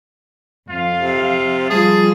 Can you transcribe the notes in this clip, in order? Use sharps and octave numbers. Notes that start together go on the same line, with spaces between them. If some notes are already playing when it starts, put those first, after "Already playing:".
F2 F4 F5
C3
F3 G3 F4 G#4 A5